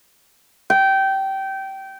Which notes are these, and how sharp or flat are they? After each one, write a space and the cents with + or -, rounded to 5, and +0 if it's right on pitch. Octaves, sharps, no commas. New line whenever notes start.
G5 -20